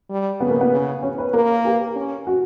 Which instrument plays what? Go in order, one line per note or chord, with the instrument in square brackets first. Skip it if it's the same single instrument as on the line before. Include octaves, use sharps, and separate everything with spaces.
[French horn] G3
[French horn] C#3 [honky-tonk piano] B3
[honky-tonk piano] A#3
B3
[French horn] C#3
[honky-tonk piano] C#4
B4
[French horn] A#3 [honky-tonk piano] A#4
[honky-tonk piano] G4
[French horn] C#4
[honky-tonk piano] F#4